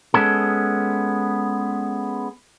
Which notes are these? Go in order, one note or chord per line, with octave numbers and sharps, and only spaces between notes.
G#3 B3 C#4 A4